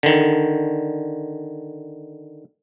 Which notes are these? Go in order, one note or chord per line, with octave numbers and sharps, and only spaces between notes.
D3 D#3